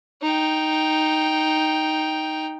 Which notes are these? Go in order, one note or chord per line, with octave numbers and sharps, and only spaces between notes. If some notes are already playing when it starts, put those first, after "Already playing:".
D#4 G5